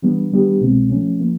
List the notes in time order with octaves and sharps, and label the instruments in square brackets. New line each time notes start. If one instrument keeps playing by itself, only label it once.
[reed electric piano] E3 G3 B3 D4
D#3 G3 B3 D4 G4
C2 B2 G#3 C4
F3 A3 C#4
F3 A#3